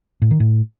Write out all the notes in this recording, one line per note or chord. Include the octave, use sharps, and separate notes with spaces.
A2
D#3
A2